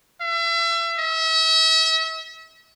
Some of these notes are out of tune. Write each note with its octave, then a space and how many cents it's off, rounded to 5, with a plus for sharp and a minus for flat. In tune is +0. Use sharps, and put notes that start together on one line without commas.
E5 +35
E5 -40